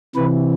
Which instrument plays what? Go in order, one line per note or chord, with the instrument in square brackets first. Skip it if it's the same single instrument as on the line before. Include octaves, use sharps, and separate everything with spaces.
[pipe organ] C3 E3 B4